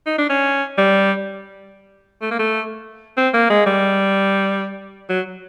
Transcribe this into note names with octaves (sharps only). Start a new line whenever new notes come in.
D#4
D4
C#4
G3
A3
A#3
A3
C4
A#3
G#3
G3
F#3